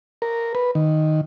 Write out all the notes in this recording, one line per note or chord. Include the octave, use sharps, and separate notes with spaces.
A#4
B4
D#3